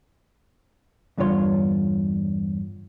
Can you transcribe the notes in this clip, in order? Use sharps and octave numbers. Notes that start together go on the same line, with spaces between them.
E2 G2 D3 F4 C#5 C6